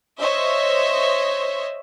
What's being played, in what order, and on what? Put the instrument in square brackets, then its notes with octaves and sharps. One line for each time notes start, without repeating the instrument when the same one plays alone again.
[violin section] C5 C#5 D#5 E5